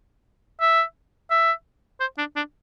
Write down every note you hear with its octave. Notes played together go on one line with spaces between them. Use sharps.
E5
E5
C5
D4
D4